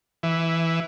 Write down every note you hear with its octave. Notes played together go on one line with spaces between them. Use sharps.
E3